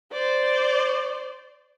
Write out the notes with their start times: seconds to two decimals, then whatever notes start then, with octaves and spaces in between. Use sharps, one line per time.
0.12 C5 D5